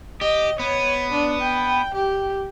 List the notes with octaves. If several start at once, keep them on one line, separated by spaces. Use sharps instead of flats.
G4 D#5
B3 C#5
D4
G5
G4